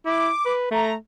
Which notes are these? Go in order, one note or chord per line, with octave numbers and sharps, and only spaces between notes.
E4 D6
B4
A3 A#5